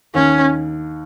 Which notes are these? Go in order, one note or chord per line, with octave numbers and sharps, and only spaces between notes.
D#2 D#3 C#4